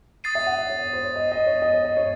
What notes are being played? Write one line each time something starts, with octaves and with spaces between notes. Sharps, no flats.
D#6 A6 C7 D#7
E5
F#5
E5
C#5
C#5
C5
C#5
D#5
D#5
C#5
D#5
C#5
D#5
C#5